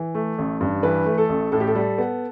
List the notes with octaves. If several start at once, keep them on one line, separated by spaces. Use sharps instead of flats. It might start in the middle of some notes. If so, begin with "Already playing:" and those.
Already playing: E3
A3
A1
G2
E3 B4
A3
A4
A1
A2 A4
G4
A4
G3
B3